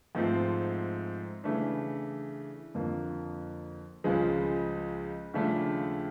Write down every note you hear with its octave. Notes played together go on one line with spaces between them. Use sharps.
G#2 F3 A3 C4
C#3 E3 A3 D4
F2 D3 F3 A#3
C#2 C#3 F3 G#3
D#2 C#3 F3 A3 D4